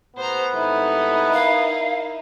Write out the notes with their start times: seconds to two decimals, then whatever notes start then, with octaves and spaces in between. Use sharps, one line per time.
0.17 A2 B3 G4 C5 A#5
0.53 G#1 G3 D#4 E4 A4
1.33 A#4 F5